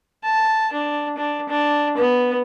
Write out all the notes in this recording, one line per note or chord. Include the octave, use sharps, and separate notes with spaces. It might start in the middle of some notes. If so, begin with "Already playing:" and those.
A5
D4
D4
D4
B3